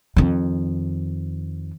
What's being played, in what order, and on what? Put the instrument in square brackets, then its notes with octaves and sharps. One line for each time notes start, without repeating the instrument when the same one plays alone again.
[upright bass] F2 D#3